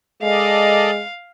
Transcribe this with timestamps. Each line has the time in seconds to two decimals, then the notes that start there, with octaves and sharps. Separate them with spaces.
0.22 G#3 A4 D5 D#5 F5